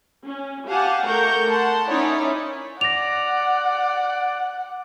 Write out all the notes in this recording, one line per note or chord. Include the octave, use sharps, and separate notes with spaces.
C#4
G4 F5 F#5 G#5 A5
A3 A#4 C#6 G6
F#5 A5 C6
C#4 D#4 E4 C#5 D5
D5 F#5 A#6 F7